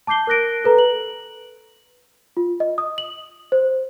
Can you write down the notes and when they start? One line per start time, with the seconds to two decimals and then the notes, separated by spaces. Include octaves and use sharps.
0.07 A5 D6 G6 C7 G7
0.27 A#4 F#6 A#6 D7
0.64 A4 B4 A#5
0.78 F#7
2.37 F4
2.60 D#5
2.78 D#6
2.98 F#7
3.52 C5